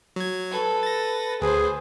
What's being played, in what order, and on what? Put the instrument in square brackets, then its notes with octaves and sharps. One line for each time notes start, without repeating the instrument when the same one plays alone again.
[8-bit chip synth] F#3 G#6
[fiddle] A4 B4
[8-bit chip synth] A6 A#6
[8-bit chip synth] D2 [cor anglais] G#4 [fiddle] B4 C5